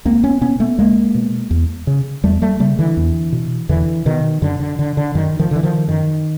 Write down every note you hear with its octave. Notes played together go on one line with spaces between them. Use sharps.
C#2 A#3 C4
B3 C#4
B2 B3 C#4
A3 B3
C#2 G#3 A#3
B2
E2
C#3
E2 G3 A3
G3 A3
C#3 G3 A3
D3 E3
E2
B2
E2 D3 E3
B2 D#3
F#2 D3
D3
D3
D3
F#2 D#3
D#3 F3
D3 E3
D#3 F3
F#2 D#3